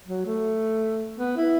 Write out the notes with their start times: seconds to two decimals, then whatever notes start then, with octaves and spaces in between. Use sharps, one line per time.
0.07 F#3
0.26 A3
1.18 B3
1.37 E4